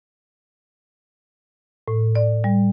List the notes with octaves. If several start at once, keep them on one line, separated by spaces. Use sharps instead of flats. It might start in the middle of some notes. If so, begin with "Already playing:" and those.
A2
D5
G3